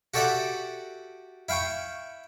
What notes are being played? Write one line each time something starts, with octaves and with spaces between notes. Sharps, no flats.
F#4 G4 A4 D5 E5 F#5
E4 F5 G5 C#6